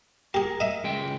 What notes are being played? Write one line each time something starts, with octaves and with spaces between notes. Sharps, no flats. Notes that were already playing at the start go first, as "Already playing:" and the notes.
G4 G#4 A#4
D#5 E5
C#2 G#3 G5